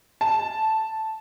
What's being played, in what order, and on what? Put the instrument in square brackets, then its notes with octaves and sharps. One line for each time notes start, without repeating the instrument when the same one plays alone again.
[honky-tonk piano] A5